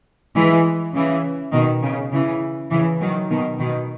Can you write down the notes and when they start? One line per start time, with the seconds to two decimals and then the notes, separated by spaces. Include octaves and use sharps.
0.35 E3 G#3
0.94 C#3 E3
1.53 B2 D#3
1.83 C#3
2.12 C#3 E3
2.71 C#3 E3
3.00 D#3 F#3
3.30 B2 D#3
3.59 B2 D#3